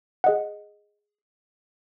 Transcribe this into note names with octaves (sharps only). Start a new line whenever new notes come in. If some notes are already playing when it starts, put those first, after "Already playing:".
G#4 D#5 F#5